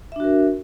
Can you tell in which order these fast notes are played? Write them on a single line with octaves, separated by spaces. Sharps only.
E5 D4 F#4 A#4